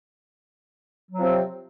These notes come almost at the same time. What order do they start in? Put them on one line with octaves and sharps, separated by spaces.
F#3 F3 C4 C3